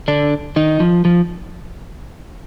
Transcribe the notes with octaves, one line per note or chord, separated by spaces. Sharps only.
D3 D4
D#3 D#4
F3
F3